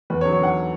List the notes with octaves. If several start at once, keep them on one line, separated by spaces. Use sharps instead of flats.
E2 B4
C#5
F#3
C#5
D3 F#5